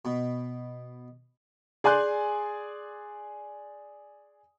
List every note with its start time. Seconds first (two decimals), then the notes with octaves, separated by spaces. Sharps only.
0.05 B2
1.84 G#4 D5 G#5 C6 F#6 G6